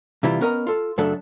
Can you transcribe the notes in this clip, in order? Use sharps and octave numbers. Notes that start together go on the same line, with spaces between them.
C3 E3 G3 E4 F4
B3 C#4 A#4 D#5 A#5
F4 A4
F#2 C#3 F#3 A3 D4 A4